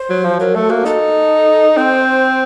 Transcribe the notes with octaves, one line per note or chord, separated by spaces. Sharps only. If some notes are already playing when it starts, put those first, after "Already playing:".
Already playing: C5
F#3
F3
F#3 A#4
A3 A4
A#3 F#4
D#4 A4
C4 C5